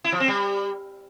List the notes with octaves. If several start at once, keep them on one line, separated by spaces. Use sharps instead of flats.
E4
F3
C4
G3